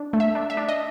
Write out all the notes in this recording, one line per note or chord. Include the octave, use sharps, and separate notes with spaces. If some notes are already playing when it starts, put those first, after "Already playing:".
Already playing: D4
A3
E5
D4
E5
D4
D#5